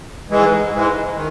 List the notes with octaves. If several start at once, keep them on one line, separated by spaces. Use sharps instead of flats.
G#2 E3 G#3
G#2 E3 G#3
D#3